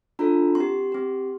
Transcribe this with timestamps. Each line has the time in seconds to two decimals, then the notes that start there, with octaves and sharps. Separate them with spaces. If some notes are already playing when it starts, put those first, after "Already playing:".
0.19 D4 F4 A4 A#5
0.55 C4 C6
0.60 G4
0.92 C4 G4